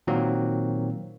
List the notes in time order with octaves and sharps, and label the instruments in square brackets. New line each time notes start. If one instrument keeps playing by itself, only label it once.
[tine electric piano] A#2 D#3 F#3 A#3 C4 F#4